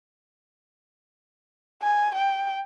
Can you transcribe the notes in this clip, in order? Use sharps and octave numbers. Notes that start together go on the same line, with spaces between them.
G#5
G5